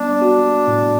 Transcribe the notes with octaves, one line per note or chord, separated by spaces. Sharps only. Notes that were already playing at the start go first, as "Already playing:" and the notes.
Already playing: G3 B3 D4
F#4
A2